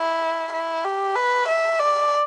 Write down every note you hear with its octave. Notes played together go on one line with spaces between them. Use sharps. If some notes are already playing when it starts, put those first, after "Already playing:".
Already playing: E4
E4
G4
B4
E5
D5